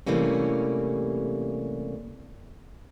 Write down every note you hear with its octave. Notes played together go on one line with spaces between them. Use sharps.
C3 E3 G3 A3 A#3 C#4